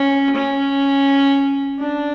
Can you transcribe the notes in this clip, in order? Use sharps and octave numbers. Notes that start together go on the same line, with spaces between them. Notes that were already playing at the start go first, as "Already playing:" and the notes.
Already playing: C#4
C#4
D4